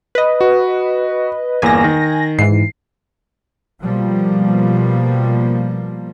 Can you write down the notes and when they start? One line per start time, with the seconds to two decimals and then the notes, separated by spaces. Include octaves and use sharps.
0.15 B4 D#5
0.41 F#4
1.62 G1 E2 A#3 G#5 A#6
1.84 D#3
2.39 G#2 E3 C7
3.81 B2 F3 G3 A#3